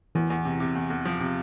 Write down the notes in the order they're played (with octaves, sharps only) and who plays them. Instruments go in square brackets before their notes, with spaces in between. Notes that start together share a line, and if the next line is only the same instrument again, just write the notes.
[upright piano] E2 [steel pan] E3
[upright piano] E2
C3
C3
E2
E2
F3
C3